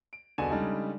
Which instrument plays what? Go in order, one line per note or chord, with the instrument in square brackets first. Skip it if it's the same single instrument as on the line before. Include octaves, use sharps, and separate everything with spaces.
[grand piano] D7
E1 C2 B2 D3 G#5 E7
C#3 G3 G#3 D4 D#4 A4